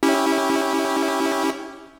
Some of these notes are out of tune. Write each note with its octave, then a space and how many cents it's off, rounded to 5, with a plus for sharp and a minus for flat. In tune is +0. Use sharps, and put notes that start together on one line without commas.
C#4 +0 E4 -20 G4 +0